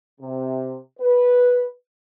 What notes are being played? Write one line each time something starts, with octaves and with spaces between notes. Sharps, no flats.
C3
B4